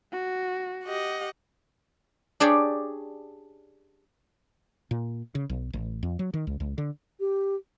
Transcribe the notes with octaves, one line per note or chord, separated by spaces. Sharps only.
F#4
G4 D#5 F#5
D4 G4 G#4 C#5 D5
A#2
C#3
B1
A1
F2
F#3
D#3
C#2
C#2
D3
G4